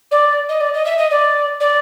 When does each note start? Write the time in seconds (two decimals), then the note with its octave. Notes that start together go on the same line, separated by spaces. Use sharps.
0.11 D5
0.49 D#5
0.60 D5
0.74 D#5
0.85 E5
0.98 D#5
1.11 D5
1.60 D5